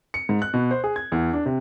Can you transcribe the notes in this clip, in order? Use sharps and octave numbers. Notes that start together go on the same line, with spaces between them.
C#7
G#2
F#6
B2
C5
G#4
G#6
E2
D4
C3